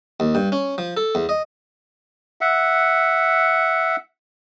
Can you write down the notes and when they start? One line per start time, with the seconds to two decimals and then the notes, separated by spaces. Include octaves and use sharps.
0.20 D#2
0.35 G2
0.52 C#4
0.78 F3
0.97 A4
1.15 E2
1.29 D#5
2.41 E5 F#5